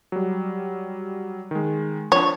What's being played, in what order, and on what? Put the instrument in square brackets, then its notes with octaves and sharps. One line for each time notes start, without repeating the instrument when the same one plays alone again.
[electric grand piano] F#3 G3
D#3 G#3
[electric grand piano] F3 D4 [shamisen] C#5